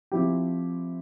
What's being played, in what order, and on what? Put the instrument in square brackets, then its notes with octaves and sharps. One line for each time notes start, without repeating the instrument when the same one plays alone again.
[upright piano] F3 C4 E4 G4